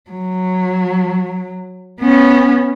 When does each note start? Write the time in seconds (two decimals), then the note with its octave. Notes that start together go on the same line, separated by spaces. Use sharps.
0.10 F#3
2.01 B3 C#4